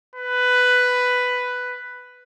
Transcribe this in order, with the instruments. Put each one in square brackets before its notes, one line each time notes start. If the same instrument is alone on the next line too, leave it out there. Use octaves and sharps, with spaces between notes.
[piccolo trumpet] B4